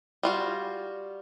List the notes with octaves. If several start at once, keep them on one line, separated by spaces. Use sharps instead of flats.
G3 F4 F#4